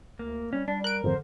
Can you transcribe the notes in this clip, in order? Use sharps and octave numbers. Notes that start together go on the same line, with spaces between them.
D2 A#3
G3 C#4
G3 D4
A#4 F#6 D7
G#1 F2 D3 C5